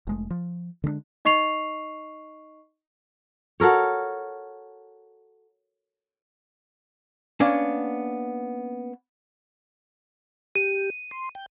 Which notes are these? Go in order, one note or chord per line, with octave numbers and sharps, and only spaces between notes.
F1 G#3 A3
F3
D3 G#3 A3 D4
D#4 D#5 C#6 C7 F7
F#4 A4 A#4 C#5
A#3 B3 C#4 D4
G4 D#7
C6
G5